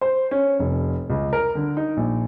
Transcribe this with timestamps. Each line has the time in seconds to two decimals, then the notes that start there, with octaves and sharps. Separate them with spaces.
0.01 C5
0.31 C#4
0.59 F1
1.10 C#2
1.33 A#4
1.55 D3
1.77 D#4
1.97 A#1